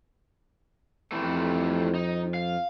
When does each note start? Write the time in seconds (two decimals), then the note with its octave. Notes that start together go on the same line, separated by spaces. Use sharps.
1.12 F2 C3 E3 A3
1.95 D#4
2.34 F5